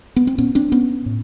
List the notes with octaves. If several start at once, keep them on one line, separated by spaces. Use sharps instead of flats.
B3
C4
A#2 B3 C#4
C4 D4
B3 C#4
A2